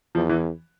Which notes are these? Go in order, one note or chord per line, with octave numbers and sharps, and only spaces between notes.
E2 F3
E3